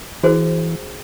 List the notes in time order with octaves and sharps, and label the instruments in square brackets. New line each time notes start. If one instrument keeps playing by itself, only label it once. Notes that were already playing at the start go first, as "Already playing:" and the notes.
[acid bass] E3 [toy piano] F#4 G#4 C5